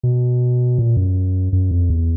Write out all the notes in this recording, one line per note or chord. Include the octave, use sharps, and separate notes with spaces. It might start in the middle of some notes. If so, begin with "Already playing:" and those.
B2
A#2
F#2
F#2
F2
E2